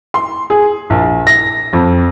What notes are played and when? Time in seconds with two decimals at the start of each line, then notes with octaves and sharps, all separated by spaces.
0.14 C6
0.50 G#4
0.90 A#1
1.27 A#6
1.73 F2